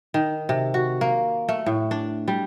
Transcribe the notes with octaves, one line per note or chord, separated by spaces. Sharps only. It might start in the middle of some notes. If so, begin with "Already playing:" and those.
D#3
C3
F#4
A#3
A3
A2
D4
G3